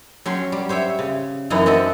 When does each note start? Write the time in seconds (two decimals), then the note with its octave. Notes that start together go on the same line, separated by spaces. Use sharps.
0.26 F#3 C#4 G5 C6
0.52 G3
0.69 C5 C#5 E5 G5
0.99 C#3
1.50 F#2 E3 C#4 D#4 E4
1.66 C4 F#4 D#5 E5 A5 B5